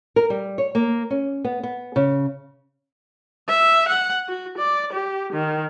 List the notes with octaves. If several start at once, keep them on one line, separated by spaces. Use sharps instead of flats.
A#4
G3
C#5
A#3
C#4
B3
B3
C#3
E5
F#5
F#4
D5
G4
D#3